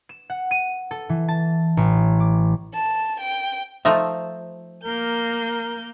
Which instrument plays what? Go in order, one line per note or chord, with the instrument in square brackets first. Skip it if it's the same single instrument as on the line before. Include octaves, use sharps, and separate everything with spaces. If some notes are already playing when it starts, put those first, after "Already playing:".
[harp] E7
F#5
D#7
A4
E3
A5
A1
D6
[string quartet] A5
G5
[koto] F3 A3 D#4 [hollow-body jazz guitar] C5 E5
[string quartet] A#3 G6 [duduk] A#4